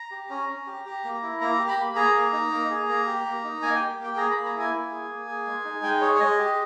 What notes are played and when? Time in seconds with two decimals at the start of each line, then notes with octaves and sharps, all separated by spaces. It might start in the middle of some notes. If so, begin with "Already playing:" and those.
Already playing: A#5
0.11 G4
0.30 C#4 A#5
0.49 C#4
0.67 G4
0.85 G4
1.04 A#3
1.23 E4
1.41 A#3 A#5
1.59 G4
1.68 B5
1.77 A#3
1.96 G#4 A#5
2.14 A#3
2.33 D#4
2.51 A#3
2.70 G#4
2.89 A#3
3.07 G4
3.25 A#3
3.44 D#4
3.62 A#3 G#5
3.75 G4 G5
3.99 A#3 G5
4.17 G#4 A#5
4.31 A#3 B5
4.45 A#5
4.54 E4 G#5
4.72 A#3
4.91 G#4
5.09 A#3
5.27 G#4
5.47 G#3
5.65 D#4
5.83 G#3 G5
6.01 G#4 C#5
6.15 C#5
6.20 G#3 D#5
6.39 G4